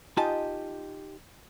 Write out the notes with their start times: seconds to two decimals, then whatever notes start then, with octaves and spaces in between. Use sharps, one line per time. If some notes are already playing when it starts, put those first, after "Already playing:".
0.17 D#4 F4 G4 D#5 G#5 A5